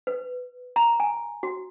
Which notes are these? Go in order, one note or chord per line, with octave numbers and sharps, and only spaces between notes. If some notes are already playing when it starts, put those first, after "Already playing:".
B4
A#5
G#5
F#4